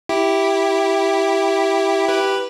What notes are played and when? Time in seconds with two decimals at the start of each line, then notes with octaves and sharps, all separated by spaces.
0.09 E4 G4
2.08 G4 B4